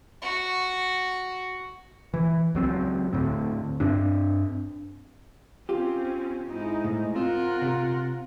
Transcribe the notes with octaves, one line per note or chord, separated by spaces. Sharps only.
F#4
E3
C#2 F#3 C4
D2 A2 C4
G2 C4 D4
C4 C#4 F4 G4
G#2 D#4 E4
A2
C4 F4 A#4 F#5
C3